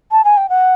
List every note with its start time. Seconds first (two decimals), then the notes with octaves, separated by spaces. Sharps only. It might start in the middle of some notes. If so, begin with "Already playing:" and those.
0.12 A5
0.24 G#5
0.37 G5
0.49 F#5